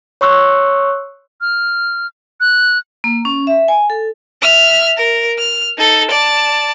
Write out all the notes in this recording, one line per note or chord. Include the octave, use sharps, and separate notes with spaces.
C#5 C6 C#6 E6 F#6
F6
F#6
A#3
C#4
E5
G#5
A4
E5 F6
A#4
F6
D#4 A4
D5 A5